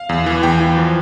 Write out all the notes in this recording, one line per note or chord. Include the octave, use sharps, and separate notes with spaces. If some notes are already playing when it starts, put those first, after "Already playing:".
Already playing: F5
E2
E3
E2 G5
E3
F3